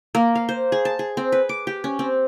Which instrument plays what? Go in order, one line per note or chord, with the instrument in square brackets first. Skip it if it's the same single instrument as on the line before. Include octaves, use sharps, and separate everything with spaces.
[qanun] A#3
F5
C5
G#4
A5
G#4
C4
B4
D6
G4
C#4
C4